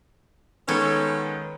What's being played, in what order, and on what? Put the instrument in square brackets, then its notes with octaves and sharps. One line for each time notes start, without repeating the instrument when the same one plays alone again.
[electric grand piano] D#3 G#3 B3 [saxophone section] C#4 A4 [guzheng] C#5